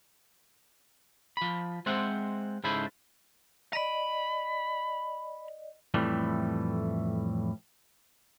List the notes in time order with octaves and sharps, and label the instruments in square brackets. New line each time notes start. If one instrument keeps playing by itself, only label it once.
[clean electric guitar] F3 B5
G#3 C4 C5 E5 F#5
G#2 C#3 E4 A4 C5 B5
[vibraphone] D5 D#5 [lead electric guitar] A#5 B5
[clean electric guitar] F2 A2 E3 G3 A3